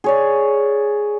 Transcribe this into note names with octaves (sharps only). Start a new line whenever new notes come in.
G#4 C#5 D5